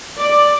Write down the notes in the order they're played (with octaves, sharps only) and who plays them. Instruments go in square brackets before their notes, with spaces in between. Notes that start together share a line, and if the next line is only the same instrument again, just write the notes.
[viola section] D5